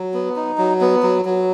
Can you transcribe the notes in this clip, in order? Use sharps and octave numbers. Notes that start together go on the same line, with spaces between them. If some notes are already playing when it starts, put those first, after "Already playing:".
Already playing: F#3
B3
D#4
F#3
B3
F#3
F#3